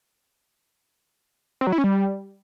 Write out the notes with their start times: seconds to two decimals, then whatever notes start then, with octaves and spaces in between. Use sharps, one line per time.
1.61 C4
1.67 F#3
1.72 E4
1.78 C#4
1.84 G3